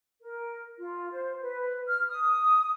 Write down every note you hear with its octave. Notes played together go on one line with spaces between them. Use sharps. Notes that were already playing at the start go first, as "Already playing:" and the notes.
A#4
F4
C5
B4
F6
D#6